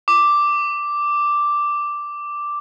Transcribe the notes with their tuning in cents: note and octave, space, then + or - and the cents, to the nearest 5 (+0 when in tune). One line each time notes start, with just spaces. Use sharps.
D6 +0